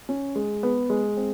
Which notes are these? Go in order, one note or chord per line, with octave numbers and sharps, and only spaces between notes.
C#4
G#3
B3
G#3
C4